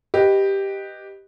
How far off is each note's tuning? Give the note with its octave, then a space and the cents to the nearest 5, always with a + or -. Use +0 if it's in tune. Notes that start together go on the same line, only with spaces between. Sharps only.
G4 +0 B4 +0 D#5 +0